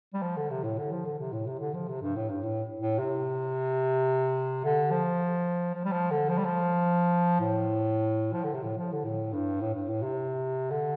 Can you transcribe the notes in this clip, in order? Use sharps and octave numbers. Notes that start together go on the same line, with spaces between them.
G3
F3
D3
C3
A2
D3
F3
D3
C3
A2
C3
D3
F3
C3
G2
A2
G2
A2
A2
C3
D3
F3
F3
G3
F3
D3
F3
G3
F3
A2
F3
D3
C3
A2
F3
D3
A2
G2
A2
G2
A2
C3
D3